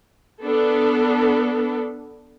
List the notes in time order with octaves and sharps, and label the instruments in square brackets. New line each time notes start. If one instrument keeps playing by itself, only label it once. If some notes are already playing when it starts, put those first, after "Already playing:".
[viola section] B3 D4 A4